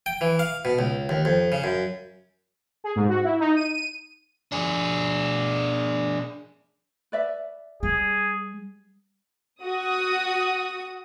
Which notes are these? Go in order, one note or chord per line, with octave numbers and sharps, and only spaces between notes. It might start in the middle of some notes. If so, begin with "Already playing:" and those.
G5
E3
F5
B2
C#2
D#2
F2
C#3
F#2
G#4
G#2
F#4
E4
D#4
D#7
D#7
D4 G#4
B4 D5 E5
G3 G#4
F#4 D#6